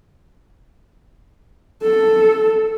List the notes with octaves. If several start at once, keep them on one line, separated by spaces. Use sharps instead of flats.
A4